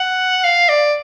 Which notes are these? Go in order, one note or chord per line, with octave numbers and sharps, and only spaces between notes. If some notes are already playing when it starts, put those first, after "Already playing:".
Already playing: F#5
F5
D5